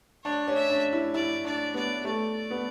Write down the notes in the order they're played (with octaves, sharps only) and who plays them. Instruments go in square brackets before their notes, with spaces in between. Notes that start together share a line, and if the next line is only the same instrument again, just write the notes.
[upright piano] D4 [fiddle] C#5
[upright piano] C#4
[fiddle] E5
[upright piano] D4
E4
[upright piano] E4 [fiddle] D5
[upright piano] D4 [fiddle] D5
[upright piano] B3 [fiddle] D5
[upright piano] A3 [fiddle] D5
[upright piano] B3